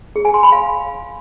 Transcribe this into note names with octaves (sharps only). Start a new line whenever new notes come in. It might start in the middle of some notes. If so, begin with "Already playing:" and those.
G#4
G#5
C6
B5
F5